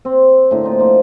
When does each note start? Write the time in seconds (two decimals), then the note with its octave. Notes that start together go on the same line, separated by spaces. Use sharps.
0.05 C4
0.51 A2 D3 A#3
0.64 C4 D#4 F4
0.78 F3 A#3 F4